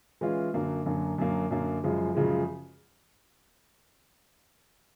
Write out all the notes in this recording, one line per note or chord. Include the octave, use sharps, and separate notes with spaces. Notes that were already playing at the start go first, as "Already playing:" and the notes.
E3 G#3 C#4 F4
F#2 D3 F#3 A#3
F#2 D3 F#3 A#3
F#2 D3 F#3 A#3
F#2 D3 F#3 A#3
F#2 C#3 F3 G#3
F#2 C#3 F3 G#3